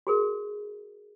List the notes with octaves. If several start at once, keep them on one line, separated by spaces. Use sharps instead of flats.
F#4 G#4 A#4